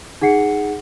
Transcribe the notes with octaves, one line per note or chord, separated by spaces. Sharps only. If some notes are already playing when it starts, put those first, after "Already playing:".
D#4 G#4 F#5 C7 C#7